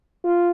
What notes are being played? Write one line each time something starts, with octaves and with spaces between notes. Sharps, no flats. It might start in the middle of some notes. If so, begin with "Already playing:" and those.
F4